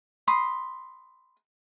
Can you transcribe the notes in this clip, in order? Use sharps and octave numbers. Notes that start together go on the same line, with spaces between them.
B5 C6 D#6